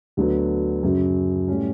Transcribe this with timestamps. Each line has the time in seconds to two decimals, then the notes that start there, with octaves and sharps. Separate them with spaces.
0.17 D2 D3 F#3 B3
0.83 F#2 C#3 F#3
1.48 A2 G3 C#4